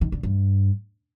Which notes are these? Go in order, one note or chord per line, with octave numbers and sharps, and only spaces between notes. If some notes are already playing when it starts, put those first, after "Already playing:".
D#3
D3
G2